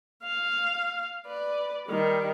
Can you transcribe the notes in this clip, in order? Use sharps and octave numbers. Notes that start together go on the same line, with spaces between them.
F5
B4 D5
D#3 G3